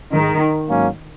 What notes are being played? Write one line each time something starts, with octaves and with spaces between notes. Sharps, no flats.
G#2 D#3 G#3 D#4
G#2 F#3 A#3 C#4